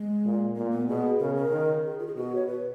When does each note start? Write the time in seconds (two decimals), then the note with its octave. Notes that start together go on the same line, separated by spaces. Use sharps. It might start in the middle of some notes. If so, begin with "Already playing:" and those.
Already playing: G#3
0.25 A#2
0.56 A#2 A#3
0.72 B3
0.88 B2 G#4
1.19 C#3 A#4
1.35 A#4
1.51 D#3
1.84 G#4
1.99 F4
2.07 G#4
2.15 B2 F#4
2.35 C#5
2.47 B4